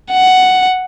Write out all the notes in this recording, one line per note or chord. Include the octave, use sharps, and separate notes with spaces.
F#5